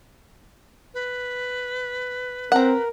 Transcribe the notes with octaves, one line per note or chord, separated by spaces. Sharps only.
B4
C4 A#4 F#5 A#5